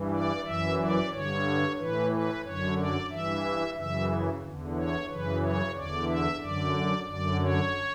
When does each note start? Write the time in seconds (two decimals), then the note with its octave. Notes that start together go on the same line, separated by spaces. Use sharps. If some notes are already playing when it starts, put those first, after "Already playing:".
Already playing: G2 E3
0.12 D5
0.45 F#2 E3 E5
0.79 D5
1.12 G2 D3 C#5
1.78 A2 E3 B4
2.12 B4
2.44 F#2 D3 C#5
2.76 D5
3.11 G2 E3 E5
3.76 F#2 C#3 E3 E5
4.42 E2 D3
4.76 C#5
5.08 F#2 C#3 E3 B4
5.42 C#5
5.74 E2 D3 D5
6.07 E5
6.40 F#2 D3 D5
7.06 F#2 D3 D5
7.41 C#5